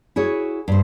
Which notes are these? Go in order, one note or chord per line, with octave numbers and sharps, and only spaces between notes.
E4 F#4 G#4 C#5
G2 C5